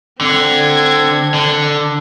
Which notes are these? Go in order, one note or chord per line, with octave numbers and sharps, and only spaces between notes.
D3 C4 G#6
D3